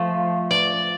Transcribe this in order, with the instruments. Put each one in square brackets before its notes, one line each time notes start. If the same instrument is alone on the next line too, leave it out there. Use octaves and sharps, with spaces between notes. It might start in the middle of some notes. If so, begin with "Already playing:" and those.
Already playing: [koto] F3 A3
D5